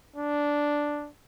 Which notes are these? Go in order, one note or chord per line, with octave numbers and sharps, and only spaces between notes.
D4